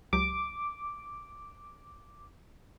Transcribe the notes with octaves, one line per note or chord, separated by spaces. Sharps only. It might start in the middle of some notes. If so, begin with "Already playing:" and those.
C#2 F#3 G4 D6